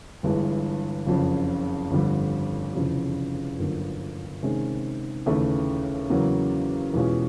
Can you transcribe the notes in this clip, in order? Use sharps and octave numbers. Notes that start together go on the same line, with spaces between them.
G1 G2 E3 G#3
F#1 F2 C#3
G1 F2 D3 G3
F1 E2 C#3 F3
G1 F#2 D3 F3 A#3
C3 D#3 G#3 C#4
D#2 C#3 E3 A3
E2 C#3 F#3 A#3
E2 B2 G#3 C#4 F4